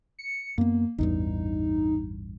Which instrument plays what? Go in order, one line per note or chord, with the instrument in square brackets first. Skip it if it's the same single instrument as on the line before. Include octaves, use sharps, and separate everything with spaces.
[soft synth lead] C#7
[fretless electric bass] F#2 B3 [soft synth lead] A#3
[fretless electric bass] A1 E2 G2 [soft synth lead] D#4